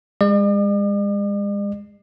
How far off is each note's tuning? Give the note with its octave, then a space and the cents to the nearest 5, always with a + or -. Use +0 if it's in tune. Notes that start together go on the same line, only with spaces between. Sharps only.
G#3 -35 D5 +45